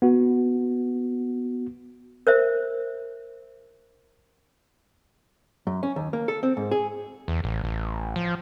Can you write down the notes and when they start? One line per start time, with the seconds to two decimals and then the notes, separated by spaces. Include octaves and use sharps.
0.02 B3 F#4
2.27 A#4 C5 E5
5.67 F#2
5.83 C#4
5.96 D#2
6.13 A#3
6.28 A4
6.43 C4
6.57 G#2
6.71 G#4
7.28 E2
7.44 A1
7.64 A1
8.16 F3